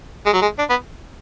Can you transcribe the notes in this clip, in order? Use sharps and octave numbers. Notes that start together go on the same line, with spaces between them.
G#3
F#3
G#3
D4
B3